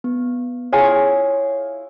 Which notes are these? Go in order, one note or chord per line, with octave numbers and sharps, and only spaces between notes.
B3
E4 F4 G#4 C#5